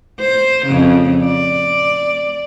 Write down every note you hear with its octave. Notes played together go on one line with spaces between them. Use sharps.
C5
F2 C#3
D5